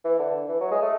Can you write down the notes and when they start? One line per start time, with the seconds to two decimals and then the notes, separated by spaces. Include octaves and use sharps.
0.04 E3
0.19 D3
0.48 E3
0.61 F#3
0.71 G#3
0.82 A3